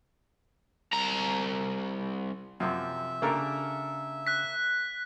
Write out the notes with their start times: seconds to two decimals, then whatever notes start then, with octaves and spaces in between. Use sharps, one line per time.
0.93 C2 A#5
2.60 F#2 C3 F3 F4 E5
3.22 C#3 A#3 D4 G4 A4 A#4
4.27 F#6 B6